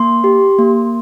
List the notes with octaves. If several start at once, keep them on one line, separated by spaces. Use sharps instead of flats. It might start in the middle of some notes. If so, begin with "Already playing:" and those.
Already playing: A#3 C6
G4
A#3